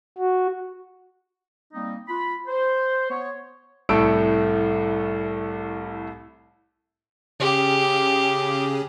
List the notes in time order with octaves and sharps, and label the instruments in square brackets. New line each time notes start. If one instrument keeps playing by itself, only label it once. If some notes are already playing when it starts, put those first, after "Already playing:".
[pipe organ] F#4
[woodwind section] G3 A#3 C4 D#4
F4 B5
C5
B3 C#5
[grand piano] C2 A2 A3 A4 E6 D7
[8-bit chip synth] C#3 C#4 G#4 [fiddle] G4